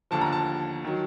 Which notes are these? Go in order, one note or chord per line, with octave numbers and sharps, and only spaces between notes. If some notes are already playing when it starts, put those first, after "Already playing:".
D#2 D3 F3 A5
A#5
A5
D#3 F#3